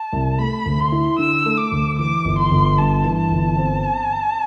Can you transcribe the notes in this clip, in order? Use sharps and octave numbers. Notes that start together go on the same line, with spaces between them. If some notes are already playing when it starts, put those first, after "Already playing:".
Already playing: A5
C2
A3 B5
D2
C6
E4
D3 E6
A3
D6
D2
E3 D6
G1
C6
G1
G2 A5
E3
A5
G1
C4